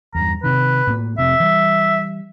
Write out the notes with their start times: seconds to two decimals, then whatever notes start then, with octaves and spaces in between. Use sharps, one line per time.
0.15 E2 G2 A#5
0.44 C3 D#3 B4
0.87 A2 G3 A#3
1.18 F1 C3 E5
1.40 E3 G3